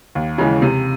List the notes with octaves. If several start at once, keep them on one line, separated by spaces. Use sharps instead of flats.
D#2
C#3 E3 G#3
C3